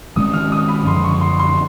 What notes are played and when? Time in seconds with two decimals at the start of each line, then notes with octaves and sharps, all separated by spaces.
0.16 G#2 D#3 G#3 C#4 D#6
0.34 F6
0.52 D#6
0.68 B5
0.86 F#2 D3 F3 C6
1.04 C#6
1.21 C6
1.39 C6